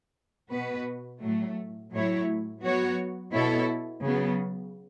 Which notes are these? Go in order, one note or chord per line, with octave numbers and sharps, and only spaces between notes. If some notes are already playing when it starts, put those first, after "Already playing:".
B2 B3 F#4 B4
A2 F#3 A3
A2 F#3 A3 E4 C#5
F#3 B3 F#4 C#5
B2 B3 E4 A4 C#5
C#3 F#3 B3